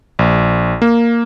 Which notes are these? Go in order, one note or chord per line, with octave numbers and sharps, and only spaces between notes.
A#1
A#3